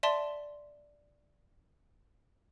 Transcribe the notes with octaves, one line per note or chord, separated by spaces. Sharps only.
D5 E5 A5 C6